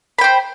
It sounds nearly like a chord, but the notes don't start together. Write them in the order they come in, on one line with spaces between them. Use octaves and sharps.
B5 G5 C5